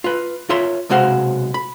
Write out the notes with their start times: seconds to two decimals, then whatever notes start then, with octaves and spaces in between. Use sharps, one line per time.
0.04 F4 B4
0.49 F4 A#4 C#5 E5 C6
0.89 B1 C3 G#3 F#4 C5 F5
1.54 B5